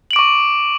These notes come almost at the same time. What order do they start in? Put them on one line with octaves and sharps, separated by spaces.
F#7 D7 D6 C#6